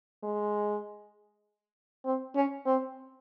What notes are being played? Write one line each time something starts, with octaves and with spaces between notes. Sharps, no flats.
G#3
C4
C#4
C4